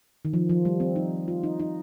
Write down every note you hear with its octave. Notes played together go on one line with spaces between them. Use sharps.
D#3
F3
F3
G3
C4
D#4
F4
D#4
D#4